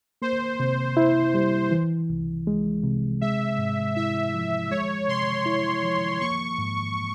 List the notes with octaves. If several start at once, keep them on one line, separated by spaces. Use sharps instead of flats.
A#3 C5
C3
E4
G3
E3
C2
G#3
C3
G#3 E5
G#2
E4 E5
F3
G#3 C#5
C3 C6
E4
F3
A#3 C#6
G#2